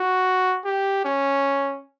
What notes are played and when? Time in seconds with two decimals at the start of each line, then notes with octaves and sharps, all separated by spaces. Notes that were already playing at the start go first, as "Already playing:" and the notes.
Already playing: F#4
0.65 G4
1.05 C#4